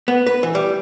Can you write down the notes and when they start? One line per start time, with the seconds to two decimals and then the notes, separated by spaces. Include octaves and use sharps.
0.08 B3
0.26 B4
0.43 E3
0.55 G3